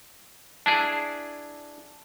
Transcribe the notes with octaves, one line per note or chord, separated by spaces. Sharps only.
D4 E4 G#4 A5